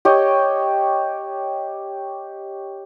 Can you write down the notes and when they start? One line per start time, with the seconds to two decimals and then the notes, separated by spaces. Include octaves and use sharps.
0.05 G4 C#5 D#5